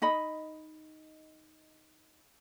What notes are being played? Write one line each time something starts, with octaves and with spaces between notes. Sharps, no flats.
D#4 D#5 B5